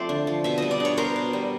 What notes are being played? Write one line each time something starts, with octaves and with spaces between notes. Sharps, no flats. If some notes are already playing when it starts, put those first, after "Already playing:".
Already playing: F3 A3 C4 C5 D5
D3
F3
B2 E5
G3 D#5
D5
D4 C#5
B3 A#4 C5
B2
G3